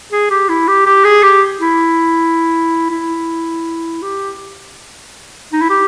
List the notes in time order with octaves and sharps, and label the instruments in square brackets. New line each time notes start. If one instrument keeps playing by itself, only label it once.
[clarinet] G#4
G4
E4
G4
G4
G#4
G4
E4
E4
G4
D#4
E4
G4